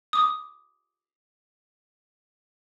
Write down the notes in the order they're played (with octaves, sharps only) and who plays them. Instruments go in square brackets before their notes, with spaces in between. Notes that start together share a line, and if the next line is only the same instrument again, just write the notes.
[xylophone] D6 D#6